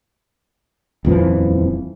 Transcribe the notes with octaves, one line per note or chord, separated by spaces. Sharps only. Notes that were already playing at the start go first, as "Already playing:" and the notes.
D#1 F2 E3 F3